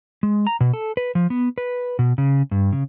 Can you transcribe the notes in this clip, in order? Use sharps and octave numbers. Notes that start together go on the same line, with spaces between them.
G#3
A#5
B2
A4
B4
F3
B3
B4
B2
C#3
G2
C#3